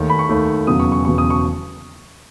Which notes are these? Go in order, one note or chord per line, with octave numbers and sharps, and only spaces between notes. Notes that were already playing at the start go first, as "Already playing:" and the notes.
Already playing: D#2 D#3 A3
B5
C#6
D#2 D#3 A3
E1 E2 C#3 F#3 B3 D#6
C#6
C#6
E1 E2 C#3 F#3 B3 C#6
D#6
C#6